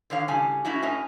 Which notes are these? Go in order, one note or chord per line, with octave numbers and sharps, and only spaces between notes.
D3 D#3 C#5 F5
A2 C#3 G3 G#5
A3 C#4 D#4 E4 F#4
A2 C#4 D#5 G#5